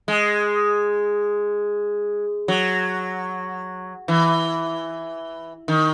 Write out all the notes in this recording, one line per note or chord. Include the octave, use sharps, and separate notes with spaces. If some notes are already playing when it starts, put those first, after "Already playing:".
G#3
F#3
E3
D#3